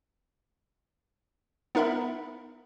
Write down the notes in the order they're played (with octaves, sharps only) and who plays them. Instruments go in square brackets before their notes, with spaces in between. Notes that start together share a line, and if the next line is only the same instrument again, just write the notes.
[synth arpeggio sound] B3 D#4 A#4 E5 B5